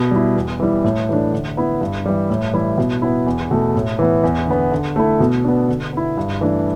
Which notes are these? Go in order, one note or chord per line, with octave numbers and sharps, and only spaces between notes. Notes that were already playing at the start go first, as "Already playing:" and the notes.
Already playing: B2
G3 E4
E2
E3 G3 E4
A2
E3 A3 D4
D3
B3 E4
G2
E3 G3
A2
E3 G3 E4
B2
B3 E4
E2
B2 A3
A2
E3 B3
E2
D3 B3
D3
A3 E4
B2
B3 D4
D3
B3 E4
G2
E3 A3 D4